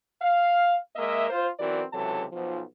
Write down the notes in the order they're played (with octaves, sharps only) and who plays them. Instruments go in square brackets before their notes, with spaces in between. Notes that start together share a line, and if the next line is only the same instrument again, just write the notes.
[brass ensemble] F5
G#3 A#3 A#4 D#5 E5
F4 C5
B1 E3 C4 F#4 A#4 D5
C#2 C3 E3 F#3 A4 A5
B1 F3